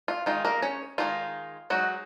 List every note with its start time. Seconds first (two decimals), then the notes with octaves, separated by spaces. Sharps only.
0.08 F4
0.26 D#3 G#3 D#4 F4
0.45 A#3 A#4
0.62 C#4 C#5
0.98 D#3 G#3 D#4 F4
1.70 F#3 G#3 D#4 F#4